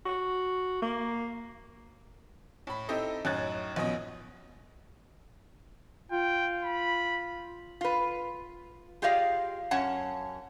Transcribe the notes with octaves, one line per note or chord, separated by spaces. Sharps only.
F#4
A#3
A2 B5
C4 D#4 E4 G4 A4 D#5
F#2 A2 D#4 F#6 G#6 A6
A#1 F#2 B2 D#5
F4 G5
B5
F4 B4
F4 G4 G#4 D5 D#5 F5
F#2 C#4 C#5 F#5 A5